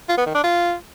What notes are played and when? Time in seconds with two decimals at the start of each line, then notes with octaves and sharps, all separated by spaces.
0.09 F4
0.18 B3
0.26 D#3
0.35 D4
0.44 F4